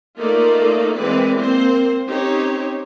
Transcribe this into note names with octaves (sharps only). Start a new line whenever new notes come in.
A3 A#3 D#4 F4 A4 D5
E3 G#3 A#3 C4 B4 D5
A#3 C4 C5
C4 C#4 D#4 G4 C5 C#5